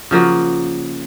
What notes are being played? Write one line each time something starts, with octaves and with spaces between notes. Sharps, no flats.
C#3 F3 A#3 F#4